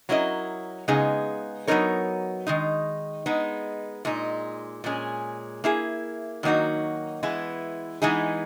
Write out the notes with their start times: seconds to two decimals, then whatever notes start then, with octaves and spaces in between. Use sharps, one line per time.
0.09 F#3 C#4 E4 A#4 D#5
0.88 C#3 G#3 B3 D#4 G#4
1.67 F#3 B3 D#4 A#4 C#5
2.47 D#3 G#3 D#4
3.26 G#3 B3 D#4
4.05 A#2 G#3 D#4
4.84 A#2 G#3 C#4 G#4
5.64 A#3 E4 G#4
6.43 D#3 F#3 A#3 D#4 F#4
7.23 E3 G#3 B3 E4
8.02 E3 G#3 B3 D#4 G#4